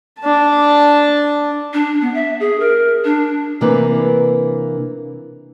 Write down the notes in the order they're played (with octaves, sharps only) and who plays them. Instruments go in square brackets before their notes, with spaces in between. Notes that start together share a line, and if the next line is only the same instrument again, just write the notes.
[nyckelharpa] D4 A5
[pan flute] D4
B3
E5
G#4
A#4
D4
[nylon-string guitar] C3 E3 A#3 D4 B4